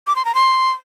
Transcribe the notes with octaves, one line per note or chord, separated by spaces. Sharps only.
D6
C6
A#5
C6